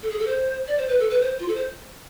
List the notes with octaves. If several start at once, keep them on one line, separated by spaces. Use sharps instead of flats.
A4
G#4
A4
C5
D5
C5
B4
A4
B4
C5
F4
A4
C5